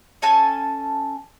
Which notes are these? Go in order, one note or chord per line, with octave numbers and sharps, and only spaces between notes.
C#4 A4 G#5 A5